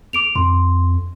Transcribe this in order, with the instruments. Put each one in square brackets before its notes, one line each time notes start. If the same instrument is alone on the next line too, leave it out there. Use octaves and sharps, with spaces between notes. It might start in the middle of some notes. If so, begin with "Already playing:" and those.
[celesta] D6 D7 F7
[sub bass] F2 [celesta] C6